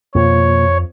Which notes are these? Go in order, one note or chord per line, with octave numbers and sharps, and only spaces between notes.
F2 B2 F3 A#3 F4 C#5